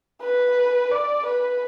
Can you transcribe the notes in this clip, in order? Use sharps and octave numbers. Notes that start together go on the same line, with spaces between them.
B4
D5
B4